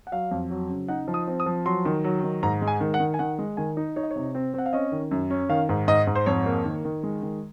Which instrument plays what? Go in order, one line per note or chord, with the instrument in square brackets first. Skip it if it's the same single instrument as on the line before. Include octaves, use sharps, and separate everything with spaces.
[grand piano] F#5
F#3 F5
F2
F#3
C#3
D#4 F#5
F3
D#6
C4
D#6
F3
F#3 C6
D#3
F#3
D#3
G#2 A#5
G#3
G#5
D#3
F#5
D#3
G#5
D#3 F#5
G#3
D#3 G#5
D#4
D#4 C#5
D#5
C#5
C3
C4
C4 F#5
F5
C#4 D#5
D#3
F#2
C#4
D#3 F5
G#2
G#2 D#5
G#2
C5
F2 C#5
A#3
D#3
D#3
G#3
D#3